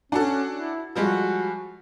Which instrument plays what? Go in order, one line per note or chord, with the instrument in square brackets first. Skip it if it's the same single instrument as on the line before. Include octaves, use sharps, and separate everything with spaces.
[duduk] C#4 [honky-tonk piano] D4 F#4 A4
[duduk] E4
[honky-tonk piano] F3 G3 G#3 [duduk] F#4